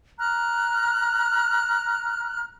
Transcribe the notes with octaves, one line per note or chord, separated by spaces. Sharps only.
A#5 F6 F#6